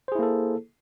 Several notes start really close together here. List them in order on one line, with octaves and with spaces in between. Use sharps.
C5 G#4 E4 A#3 A4